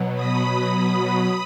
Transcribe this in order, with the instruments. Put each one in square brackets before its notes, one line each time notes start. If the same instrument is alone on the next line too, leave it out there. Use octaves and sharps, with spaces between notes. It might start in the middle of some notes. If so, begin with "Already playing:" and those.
Already playing: [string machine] B2 F#3
B5 D#6